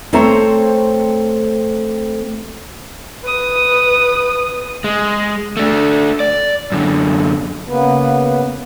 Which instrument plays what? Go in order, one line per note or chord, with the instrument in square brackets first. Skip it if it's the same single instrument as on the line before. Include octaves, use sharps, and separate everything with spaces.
[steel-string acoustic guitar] A3 C4 A4 C5 C#5 A#5
[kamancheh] B4 D#6
[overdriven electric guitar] G#3
A3 D4
D5
F#2 D3
[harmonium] C#3 A#3 B3 B4